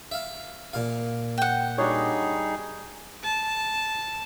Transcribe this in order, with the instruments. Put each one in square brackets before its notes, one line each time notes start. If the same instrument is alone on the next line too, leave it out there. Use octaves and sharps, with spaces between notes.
[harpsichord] E5 F5
A#2 F5
[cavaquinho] F#5 G5
[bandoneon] G3 D#4 G#4 [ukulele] D4 F#4 C#5
[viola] A5